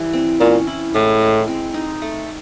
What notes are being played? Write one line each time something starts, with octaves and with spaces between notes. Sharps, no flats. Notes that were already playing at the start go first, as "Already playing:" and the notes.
Already playing: E3 G3
C4
A#2 C#4
E4
A2 G#3
G#3
C4
D#4
A3